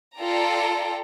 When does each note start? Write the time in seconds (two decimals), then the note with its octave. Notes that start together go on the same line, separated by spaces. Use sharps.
0.18 F4 A4 D5 G5 A#5